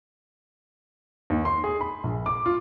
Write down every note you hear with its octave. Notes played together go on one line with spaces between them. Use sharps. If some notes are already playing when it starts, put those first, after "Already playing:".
D#2
C6
G#4
B5
A#1
D6
F4